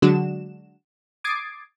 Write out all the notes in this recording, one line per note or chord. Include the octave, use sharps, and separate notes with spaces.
D3 F#3 G#3 D4 F#4 E7
D6 D#6 G#6 A6 C7 D7